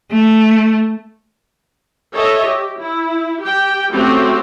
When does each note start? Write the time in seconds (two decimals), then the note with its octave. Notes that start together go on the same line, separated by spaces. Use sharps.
0.11 A3
2.14 A4 C#5 D#5 E5
2.46 G4
2.81 E4
3.42 G4 G5
3.92 A3 C4 C#4 F#4 G4